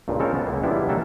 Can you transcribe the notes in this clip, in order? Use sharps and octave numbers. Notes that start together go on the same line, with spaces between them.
C#2 G2 A#2
C#3 G#3 C4 A4 A#4 C#5
B3
C#2 A#3
E3 G3 G#3 B3 D4 E4
F#3 G3 A#3 D4 A4 E5